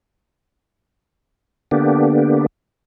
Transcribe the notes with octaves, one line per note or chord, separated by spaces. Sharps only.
D3 A#3 B3 D4 G4